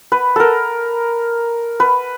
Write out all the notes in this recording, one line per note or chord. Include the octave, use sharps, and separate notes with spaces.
B4
A4 A#4
B4